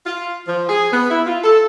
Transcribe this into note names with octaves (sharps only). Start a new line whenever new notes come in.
F4
F3
G#4
B3
E4
F4
A4